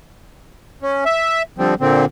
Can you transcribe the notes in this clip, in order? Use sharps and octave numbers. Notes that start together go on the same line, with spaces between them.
C#4
E5
D3 F3 G3 C4
A#2 D3 C4